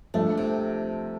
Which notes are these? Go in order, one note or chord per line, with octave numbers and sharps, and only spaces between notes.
F3 A3 D4
C3